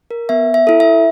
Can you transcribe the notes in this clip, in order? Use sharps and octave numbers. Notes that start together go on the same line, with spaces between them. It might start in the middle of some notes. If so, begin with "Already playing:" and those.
A#4
B3 E5
E5
E4 A4
E5